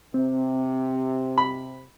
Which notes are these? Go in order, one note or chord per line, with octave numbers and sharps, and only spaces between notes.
C3 C4
B5